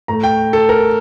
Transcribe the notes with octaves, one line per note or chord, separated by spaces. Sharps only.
A2 A3 A#5
G5
A4
A#4